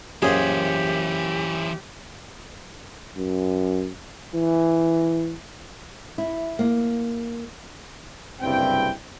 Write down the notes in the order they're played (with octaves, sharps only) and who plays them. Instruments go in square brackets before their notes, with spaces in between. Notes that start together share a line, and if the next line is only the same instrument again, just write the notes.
[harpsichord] F#2 A#2 [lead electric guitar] E3 C5 [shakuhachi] G4 [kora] G#4
[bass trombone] F#2
E3
[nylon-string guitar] E4
A#3
[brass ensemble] F#1 C2 G2 C4 E4 G5